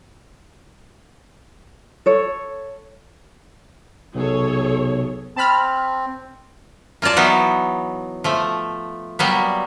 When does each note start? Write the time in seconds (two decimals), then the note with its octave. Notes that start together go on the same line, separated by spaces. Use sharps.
2.06 A4 C#5
4.15 B1 C3 G#4 A4 C#5
5.36 C4 A5 B5 F6
7.02 A#3 F4 A#4 D5 A5
7.16 E3 F#3 B3 D#4
8.24 F3 A3
9.19 F#3 G3 A#3 B3